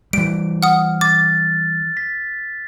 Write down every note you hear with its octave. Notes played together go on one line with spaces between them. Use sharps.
E3 G3 D7
F#5 D#6 F6
D6 A6
B6